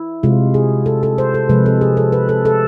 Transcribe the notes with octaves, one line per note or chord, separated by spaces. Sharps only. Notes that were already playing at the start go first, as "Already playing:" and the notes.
Already playing: E4
C3 G#3 F4
G#4
A4
A4
C5
A4
C3 F3 G#3 B4
A4
G#4
A4
B4
A4
A4